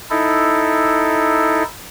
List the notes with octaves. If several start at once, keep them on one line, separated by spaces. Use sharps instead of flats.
D#4 E4 A4